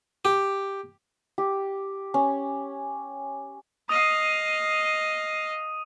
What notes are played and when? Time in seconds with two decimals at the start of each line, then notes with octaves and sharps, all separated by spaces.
0.25 G4
1.38 G4
2.14 C#4
3.89 D#5 F5 D#6 D#7